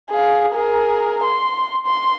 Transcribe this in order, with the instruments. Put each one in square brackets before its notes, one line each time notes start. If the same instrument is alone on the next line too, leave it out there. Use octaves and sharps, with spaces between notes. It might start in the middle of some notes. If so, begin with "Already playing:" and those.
[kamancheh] G#4 F5
G#4 A#4
C6
C6